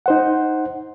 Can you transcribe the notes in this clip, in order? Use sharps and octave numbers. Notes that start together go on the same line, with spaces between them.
D#4 C5 F#5